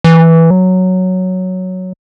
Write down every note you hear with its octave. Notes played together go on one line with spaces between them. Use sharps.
E3
F#3